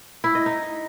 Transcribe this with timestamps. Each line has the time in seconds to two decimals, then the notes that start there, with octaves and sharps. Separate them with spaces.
0.24 E4
0.35 D#5
0.46 D#4